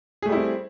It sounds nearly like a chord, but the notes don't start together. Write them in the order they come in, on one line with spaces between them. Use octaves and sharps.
G#4 A3 G3 E4 C4